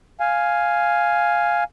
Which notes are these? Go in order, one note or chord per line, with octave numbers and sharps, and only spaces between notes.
F5 G#5